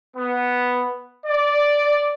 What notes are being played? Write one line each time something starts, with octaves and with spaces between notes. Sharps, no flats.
B3
D5